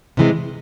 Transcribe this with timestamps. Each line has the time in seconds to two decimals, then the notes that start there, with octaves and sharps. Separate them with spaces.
0.17 C3 E3 G#3